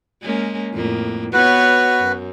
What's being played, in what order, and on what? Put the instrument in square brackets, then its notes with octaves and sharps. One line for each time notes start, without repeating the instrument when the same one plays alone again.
[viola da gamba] G#3 A#3 C#4
F2 A2 A#3
[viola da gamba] B3 C#5 [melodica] F#4 B4
[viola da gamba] F#2